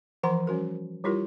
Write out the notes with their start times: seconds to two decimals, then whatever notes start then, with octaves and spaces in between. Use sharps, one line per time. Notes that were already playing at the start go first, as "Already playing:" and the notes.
0.23 E3 F3 F#5 A#5 C6
0.47 G3 C#4 F#4 A#4
1.04 G3 E4 F4 G4 A#4